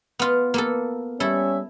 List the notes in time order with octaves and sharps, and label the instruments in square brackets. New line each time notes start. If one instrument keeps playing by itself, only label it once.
[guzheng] B3 F4
A#3 B3 A4
[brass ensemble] G3 C#4 E5 [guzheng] E4 A4